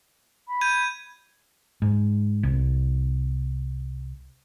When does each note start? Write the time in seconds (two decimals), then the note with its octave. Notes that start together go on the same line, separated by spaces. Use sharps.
0.48 B5
0.61 G6 G#6 D#7
1.82 G#2
2.43 C2